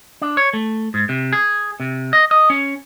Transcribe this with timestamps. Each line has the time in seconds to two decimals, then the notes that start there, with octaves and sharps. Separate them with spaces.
0.22 D4
0.37 C#5
0.54 A3
0.94 G#2
1.09 C3
1.33 G#4
1.80 C3
2.13 D#5
2.31 D#5
2.50 C#4